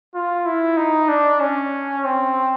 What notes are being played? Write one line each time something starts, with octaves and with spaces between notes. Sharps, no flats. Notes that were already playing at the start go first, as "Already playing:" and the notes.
F4
E4
D#4
D4
C#4
C4